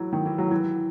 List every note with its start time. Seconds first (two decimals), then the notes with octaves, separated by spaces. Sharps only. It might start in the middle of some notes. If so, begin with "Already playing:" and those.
Already playing: E3 F#3
0.13 D#3
0.26 E3
0.38 F#3
0.51 E3